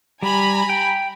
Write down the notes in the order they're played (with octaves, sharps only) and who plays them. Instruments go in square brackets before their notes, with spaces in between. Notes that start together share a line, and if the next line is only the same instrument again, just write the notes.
[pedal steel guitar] G3 [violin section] G#5 A#5 B5
[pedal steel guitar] G5